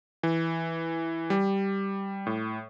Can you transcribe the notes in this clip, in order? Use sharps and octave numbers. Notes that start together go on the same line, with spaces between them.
E3
G3
A2